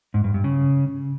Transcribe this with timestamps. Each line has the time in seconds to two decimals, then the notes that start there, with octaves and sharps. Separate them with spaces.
0.14 G#2
0.24 G2
0.34 G2
0.44 C#3